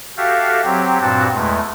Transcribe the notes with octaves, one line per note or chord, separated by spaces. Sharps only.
F#4 G4 A4 E5 F5
F#3 C4 G4
G2 A#2 C4 F#4 A5
E2 G#3 A3